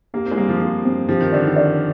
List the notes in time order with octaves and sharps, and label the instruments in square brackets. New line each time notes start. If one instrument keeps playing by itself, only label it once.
[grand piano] A#3 [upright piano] G4
[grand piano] C4
G#3
[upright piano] G3 [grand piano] A#3
[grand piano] F3
[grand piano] F3 [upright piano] G4
[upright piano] C4
[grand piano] F3 [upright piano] G4
[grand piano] D#3
[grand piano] D3 [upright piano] D5
[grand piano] D#3
[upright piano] D5